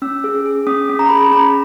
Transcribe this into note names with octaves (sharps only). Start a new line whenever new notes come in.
C#4 E6
G#4
G#4
C#4 D#6
C#4
A#5
G#4 B5
A#5
C#4 A#5